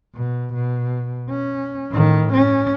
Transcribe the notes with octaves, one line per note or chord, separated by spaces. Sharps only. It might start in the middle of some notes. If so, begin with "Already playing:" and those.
B2
B2
C#4
A2 D#3
C#4